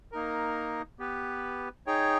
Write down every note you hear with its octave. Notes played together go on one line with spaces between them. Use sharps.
A#3 D#4 A#4
B3 G4 B4
D#4 G#4 C#5 G5